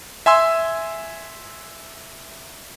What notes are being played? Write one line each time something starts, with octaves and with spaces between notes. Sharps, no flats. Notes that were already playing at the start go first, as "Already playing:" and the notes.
E5 G#5 C6 E6